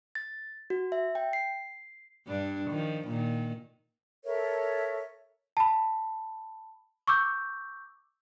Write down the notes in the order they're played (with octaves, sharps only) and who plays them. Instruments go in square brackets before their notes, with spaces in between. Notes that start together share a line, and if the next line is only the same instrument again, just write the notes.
[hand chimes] A6
F#4
E5
G5
C7
[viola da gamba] G2 D4
D#3 F3
A#2 D#3
[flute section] A4 A#4 C#5 E5
[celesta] A5 B5
C#6 D6 E6 G6